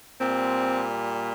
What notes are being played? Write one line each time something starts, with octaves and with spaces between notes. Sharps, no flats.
A#2 G3 C4